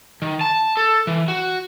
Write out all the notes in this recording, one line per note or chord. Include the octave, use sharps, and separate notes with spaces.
D#3
A5
A4
E3
F#4